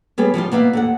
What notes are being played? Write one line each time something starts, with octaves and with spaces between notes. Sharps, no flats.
G3 B3 G#4 A4 C#5
F3 G3 D#4 F4
A#3 B3 D5 E5 F5
D#2 A4 F#5